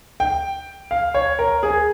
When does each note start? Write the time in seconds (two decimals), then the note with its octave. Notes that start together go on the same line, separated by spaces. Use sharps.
0.20 G5
0.91 F5
1.14 C#5
1.39 A#4
1.63 G#4